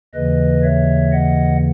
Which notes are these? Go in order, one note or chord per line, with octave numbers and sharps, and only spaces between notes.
D#2 C#3 E3 B4 D#5
C#5 E5
D#5 F#5